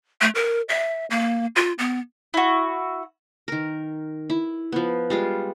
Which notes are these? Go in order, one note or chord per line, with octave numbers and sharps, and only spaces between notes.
A3
A#4
E5
A#3
F4
B3
E4 F#4
D#3 A#4
E4
F3 B3
G3 G#3 F4